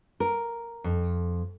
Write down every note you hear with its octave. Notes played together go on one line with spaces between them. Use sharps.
A#4
F2